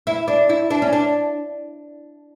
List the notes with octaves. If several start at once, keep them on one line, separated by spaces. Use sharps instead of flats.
E4
D4
E4
D4
C#4
D4